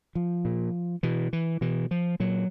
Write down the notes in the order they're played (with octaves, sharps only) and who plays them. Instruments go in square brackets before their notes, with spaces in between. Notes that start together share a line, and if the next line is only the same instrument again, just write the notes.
[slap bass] F3
A#2
B2 E3
E3
B2 E3
F3
A#2 F#3